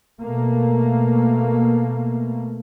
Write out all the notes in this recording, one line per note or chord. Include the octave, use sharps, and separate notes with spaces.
B2 A3 A#3